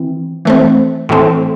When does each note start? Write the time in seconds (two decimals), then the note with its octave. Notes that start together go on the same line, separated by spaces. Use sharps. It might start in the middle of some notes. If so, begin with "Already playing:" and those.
Already playing: E3 C4
0.45 E3 A3 C4
1.09 A2 E3 A3 C4